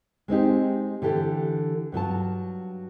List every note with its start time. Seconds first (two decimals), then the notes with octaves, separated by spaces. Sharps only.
0.28 G#3 C4 D#4 G4
1.02 D3 E3 G4 A4
1.92 G2 F#3 F4 A5